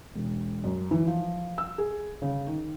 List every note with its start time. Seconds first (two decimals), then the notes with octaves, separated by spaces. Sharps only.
0.15 E1
0.64 F#2
0.91 E3
1.07 F3
1.58 E6
1.78 G#4
2.22 C#3
2.47 D#3